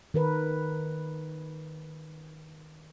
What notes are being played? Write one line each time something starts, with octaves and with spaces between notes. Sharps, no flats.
D#3 A#4 B4